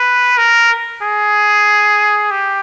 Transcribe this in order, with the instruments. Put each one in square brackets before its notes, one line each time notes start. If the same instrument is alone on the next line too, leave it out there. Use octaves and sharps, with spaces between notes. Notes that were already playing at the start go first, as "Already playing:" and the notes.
Already playing: [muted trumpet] B4
A#4
G#4
G4